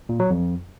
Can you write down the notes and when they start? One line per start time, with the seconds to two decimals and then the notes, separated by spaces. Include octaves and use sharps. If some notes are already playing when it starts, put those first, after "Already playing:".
0.09 A#2
0.20 F#3
0.30 F2